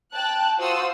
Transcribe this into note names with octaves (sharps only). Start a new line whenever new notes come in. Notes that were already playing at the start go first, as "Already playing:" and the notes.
G5 A5 F#6
F4 F#4 C5 C6 D#6 E6